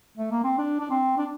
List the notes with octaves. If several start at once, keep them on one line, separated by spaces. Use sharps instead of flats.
A3
A#3
C4
D4
D4
C4
D4